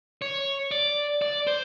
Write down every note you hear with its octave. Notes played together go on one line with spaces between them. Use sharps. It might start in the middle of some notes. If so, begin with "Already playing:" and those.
C#5
D5
D5
C5